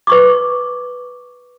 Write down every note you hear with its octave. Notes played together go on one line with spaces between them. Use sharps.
B4 C#6 D6